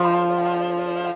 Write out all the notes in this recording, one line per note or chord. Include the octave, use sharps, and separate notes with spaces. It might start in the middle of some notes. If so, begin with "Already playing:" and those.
Already playing: F3